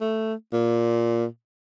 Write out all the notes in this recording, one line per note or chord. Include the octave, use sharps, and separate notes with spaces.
A3
A#2